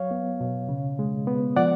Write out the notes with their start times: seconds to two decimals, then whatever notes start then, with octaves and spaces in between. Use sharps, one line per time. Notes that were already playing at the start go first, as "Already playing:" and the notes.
Already playing: F#3 C#5 F5
0.11 B3
0.41 B2
0.69 C#3
0.99 G#3
1.27 B3
1.56 F3 D5 F#5